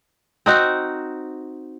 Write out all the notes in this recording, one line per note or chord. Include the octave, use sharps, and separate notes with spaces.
C4 D#4 F#4